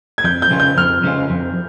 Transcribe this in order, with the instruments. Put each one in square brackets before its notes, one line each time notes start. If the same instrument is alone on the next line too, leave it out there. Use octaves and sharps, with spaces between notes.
[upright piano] G#6
[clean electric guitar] F2 [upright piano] G6
[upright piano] G6
[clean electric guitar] C#3 G#3 C#4 F4
[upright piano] G6
[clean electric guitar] F2 [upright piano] F6
[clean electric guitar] C#3 G#3 C#4 F4
F2